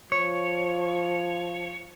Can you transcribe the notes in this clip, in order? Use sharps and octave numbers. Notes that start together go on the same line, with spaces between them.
F3 C#5